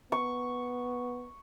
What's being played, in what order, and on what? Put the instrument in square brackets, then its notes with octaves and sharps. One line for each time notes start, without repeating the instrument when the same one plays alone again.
[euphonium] B3 [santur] C#6